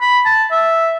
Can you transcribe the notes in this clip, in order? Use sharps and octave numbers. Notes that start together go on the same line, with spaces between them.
B5
A5
E5